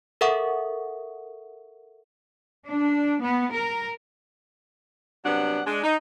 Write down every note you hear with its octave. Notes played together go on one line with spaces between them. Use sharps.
A4 A#4 E5 F#5 C#6 D#6
D4
B3
A#4
C3 F#3 G3 B3 D4 F#5
G#3 D4
D#4